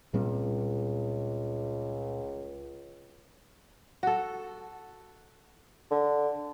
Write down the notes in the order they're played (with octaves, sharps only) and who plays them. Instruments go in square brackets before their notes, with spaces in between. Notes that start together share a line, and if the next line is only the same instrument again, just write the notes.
[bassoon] C#2 [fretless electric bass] A#2 G3 C4
[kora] F#4 A4
[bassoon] D3